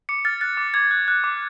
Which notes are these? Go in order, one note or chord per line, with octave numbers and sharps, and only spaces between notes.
D6 C#7
F6 A6
F#6 A6
D6
D6 G#6
F#6
F#6
D6